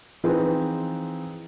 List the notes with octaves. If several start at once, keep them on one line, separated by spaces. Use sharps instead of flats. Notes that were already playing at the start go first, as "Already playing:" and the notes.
E3 F3 C4 D#4 G#4 B4